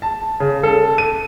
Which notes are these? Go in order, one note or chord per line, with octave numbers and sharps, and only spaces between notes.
A5
C#3
A4
D#7